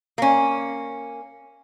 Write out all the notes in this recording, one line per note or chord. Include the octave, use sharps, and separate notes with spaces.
A#3 C#4